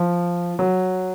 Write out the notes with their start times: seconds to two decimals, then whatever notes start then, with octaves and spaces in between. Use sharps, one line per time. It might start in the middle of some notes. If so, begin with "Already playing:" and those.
Already playing: F3
0.59 F#3